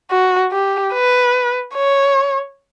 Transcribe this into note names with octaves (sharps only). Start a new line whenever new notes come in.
F#4
G4
B4
C#5